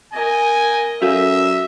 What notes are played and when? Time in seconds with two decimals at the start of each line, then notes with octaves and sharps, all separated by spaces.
0.12 A#4 D#5 G#5
1.02 F#2 F#4 A4 E5 F5